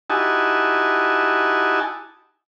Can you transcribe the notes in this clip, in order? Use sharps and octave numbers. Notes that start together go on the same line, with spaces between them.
D#4 E4 F#4 G4 G#5 A5